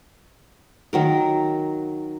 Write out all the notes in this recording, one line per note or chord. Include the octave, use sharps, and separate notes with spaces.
D#3 F#3 A#4